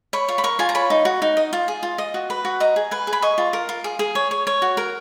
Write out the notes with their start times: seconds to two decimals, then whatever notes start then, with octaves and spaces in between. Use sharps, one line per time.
0.13 C#5 B5
0.28 F4 C#6
0.38 B5
0.44 A#4 C#6
0.59 F4 G#5
0.69 A#5
0.75 C#5 B5
0.90 D#4
1.05 F#4
1.22 D#4
1.37 D#5
1.53 F4
1.68 G#4
1.83 F4
1.98 D#5
2.14 F#4
2.30 B4
2.45 F#4
2.60 D#5 A#5
2.76 G#4
2.91 B4 G#5
3.07 G#4
3.13 B5
3.22 D#5 C#6
3.38 F4
3.53 A#4
3.69 F4
3.84 G#4
3.99 G#4
4.15 C#5
4.31 C#5
4.47 C#5
4.62 F#4
4.77 A#4